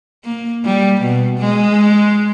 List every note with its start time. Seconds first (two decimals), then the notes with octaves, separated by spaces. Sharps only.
0.24 A#3
0.65 G3
1.02 B2
1.39 G#3